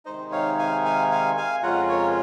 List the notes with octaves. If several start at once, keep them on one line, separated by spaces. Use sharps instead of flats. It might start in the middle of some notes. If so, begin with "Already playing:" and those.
C3 D#3 G#3 D#4 C5 D#5
C#5 F5
F5 G#5
F5 G#5
F5 G#5
F5 G#5
F2 C#3 G#3 C#4 F4 F#5 A#5
A#4 C#5